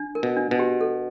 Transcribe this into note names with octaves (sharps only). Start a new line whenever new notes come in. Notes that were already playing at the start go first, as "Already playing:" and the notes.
Already playing: D4
A#4
B2
D4
B2
G4
A4